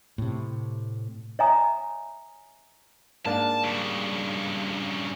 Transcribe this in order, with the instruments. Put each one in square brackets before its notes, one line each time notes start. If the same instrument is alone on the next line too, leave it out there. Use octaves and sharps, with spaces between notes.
[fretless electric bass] A2 C3
[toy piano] C#5 D#5 E5 G#5 A#5 D#6
[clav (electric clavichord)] G#2 A#3 D4 [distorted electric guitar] A5
[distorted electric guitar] G2 C#3